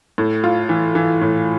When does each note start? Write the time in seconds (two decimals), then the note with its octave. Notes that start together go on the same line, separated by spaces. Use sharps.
0.18 A2
0.44 F4
0.69 E3
0.95 E3
1.21 A2